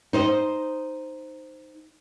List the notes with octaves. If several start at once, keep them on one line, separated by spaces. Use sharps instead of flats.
D#4 C5 D#5